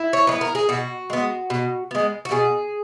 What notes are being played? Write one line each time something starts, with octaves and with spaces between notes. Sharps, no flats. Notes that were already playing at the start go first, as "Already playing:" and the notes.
Already playing: E4
C#5
G#3 B3 B4
A#4
G#4
B2 F#4
G#3 B3
B2
G#3 B3
F#4
B2 G#4